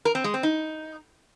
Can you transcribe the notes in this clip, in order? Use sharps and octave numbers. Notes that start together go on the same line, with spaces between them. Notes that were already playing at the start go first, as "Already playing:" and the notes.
A#4
C4
G#3
C4
D#4